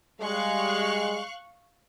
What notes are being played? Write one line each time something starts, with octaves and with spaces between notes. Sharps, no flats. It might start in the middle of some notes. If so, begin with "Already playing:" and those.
G3 G#3 F5 C#6 F#6